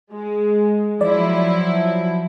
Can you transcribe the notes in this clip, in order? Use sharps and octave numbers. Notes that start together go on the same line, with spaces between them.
G#3
F3 F#3 E4 D5